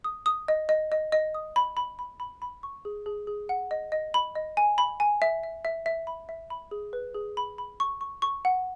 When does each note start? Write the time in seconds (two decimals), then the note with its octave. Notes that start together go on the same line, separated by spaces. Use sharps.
0.04 D#6
0.26 D#6
0.48 D#5
0.69 D#5
0.92 D#5
1.12 D#5
1.34 D#6
1.56 B5
1.77 B5
1.99 B5
2.20 B5
2.42 B5
2.63 C#6
2.85 G#4
3.06 G#4
3.27 G#4
3.49 F#5
3.71 D#5
3.92 D#5
4.14 B5
4.35 D#5
4.57 G#5
4.78 B5
5.00 G#5
5.22 E5
5.43 E5
5.65 E5
5.86 E5
6.07 B5
6.29 E5
6.50 B5
6.71 G#4
6.93 B4
7.14 G#4
7.37 B5
7.58 B5
7.80 C#6
8.01 C#6
8.22 C#6
8.45 F#5